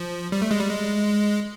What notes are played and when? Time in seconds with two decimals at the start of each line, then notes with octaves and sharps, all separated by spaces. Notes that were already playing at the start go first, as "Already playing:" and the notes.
Already playing: F3
0.32 G3
0.42 A3
0.51 G#3
0.60 G3
0.70 G#3